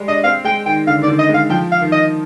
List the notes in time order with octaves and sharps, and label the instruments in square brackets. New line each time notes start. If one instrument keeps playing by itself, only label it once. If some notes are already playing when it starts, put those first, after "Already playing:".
Already playing: [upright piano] G3 G#3
[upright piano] D4 [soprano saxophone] D#5
[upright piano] C4 [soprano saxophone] F5
[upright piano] G#3 [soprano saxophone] G5
[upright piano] D#3 [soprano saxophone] G5
[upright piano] D3 [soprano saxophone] F5
[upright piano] D#3 [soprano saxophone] D5
[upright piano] D3
[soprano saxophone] D#5
[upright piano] G#3 [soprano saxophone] F5
[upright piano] F3 [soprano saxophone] G5
[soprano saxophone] F5
[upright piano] D#3
[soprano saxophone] D#5